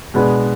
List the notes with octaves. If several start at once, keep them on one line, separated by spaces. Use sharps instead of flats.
B2 G#3 B3 D4